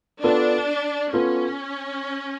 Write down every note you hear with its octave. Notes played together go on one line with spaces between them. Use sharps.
B3 D4 F4 A4
B3 C#4 F4 A4